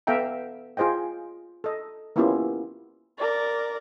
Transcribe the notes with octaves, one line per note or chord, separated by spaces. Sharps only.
B3 A4 E5 F5 G5 A#5
F4 G#4 C5 D#5 G5
A4 D#5
A#3 B3 C#4 E4 F4 G4
A#4 D5